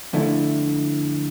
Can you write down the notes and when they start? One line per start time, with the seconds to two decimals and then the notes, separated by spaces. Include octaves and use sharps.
0.13 F2 D3 A3 E4